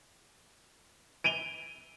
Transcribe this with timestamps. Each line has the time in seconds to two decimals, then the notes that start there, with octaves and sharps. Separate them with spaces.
1.24 D7 D#7 F7 G7